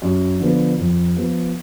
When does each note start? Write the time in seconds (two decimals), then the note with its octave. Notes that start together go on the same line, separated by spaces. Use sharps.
0.02 F#2
0.40 D3 F3 B3
0.79 F2
1.16 F3 B3